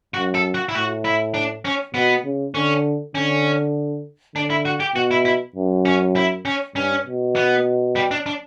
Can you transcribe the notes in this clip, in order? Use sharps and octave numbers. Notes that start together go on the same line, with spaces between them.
F#2 F#4
A4
F#4
E4
A2 F#4
E4
D4
C#4
B2 B3
C#3
D3 C#4
D3 C#4
D3 D4
E4
F#4
G4
B2 F#4
E4
E4
F#2
C#4
E4
C#4
G2 C#4
B2
B3
G3
D4
D4